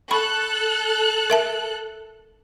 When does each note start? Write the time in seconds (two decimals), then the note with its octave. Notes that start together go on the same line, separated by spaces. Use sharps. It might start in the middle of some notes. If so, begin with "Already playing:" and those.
0.11 A4 B5 C#6 F#6
1.30 A#4 E5 A5